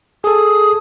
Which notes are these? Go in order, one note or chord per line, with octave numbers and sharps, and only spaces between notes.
G#4 A4 D#6